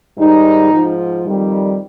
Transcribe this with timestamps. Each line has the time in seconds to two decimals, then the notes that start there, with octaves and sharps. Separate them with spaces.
0.18 G#2 D#3 G3 D#4
0.71 G#2 F3
1.25 F2 D#3 G3